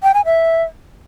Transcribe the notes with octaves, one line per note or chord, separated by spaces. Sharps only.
G5
G#5
E5